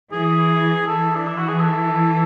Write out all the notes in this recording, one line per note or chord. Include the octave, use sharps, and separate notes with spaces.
E3 G#4
E3 A4
D4
E4
F#4
G#4
A4